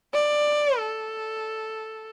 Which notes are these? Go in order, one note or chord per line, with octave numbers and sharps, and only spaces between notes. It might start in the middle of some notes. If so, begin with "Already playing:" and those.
D5
A4